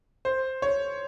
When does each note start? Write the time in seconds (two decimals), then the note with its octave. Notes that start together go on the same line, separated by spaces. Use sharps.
0.25 C5
0.62 C#5